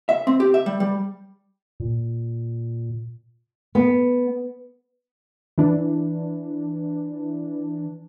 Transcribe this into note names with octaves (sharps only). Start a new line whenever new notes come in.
E5
C4
G4
E5
G3
G3
A#2
B3
E3 D4